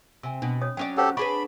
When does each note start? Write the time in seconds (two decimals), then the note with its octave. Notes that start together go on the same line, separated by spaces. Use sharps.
0.23 C3 G#5 E6
0.42 B2 D4
0.62 C#5 D#6
0.77 F#3 C#4 D5 G5
0.97 G4 A4 C5 C#5 F#5
1.17 D4 G#4 B4 B5 C#6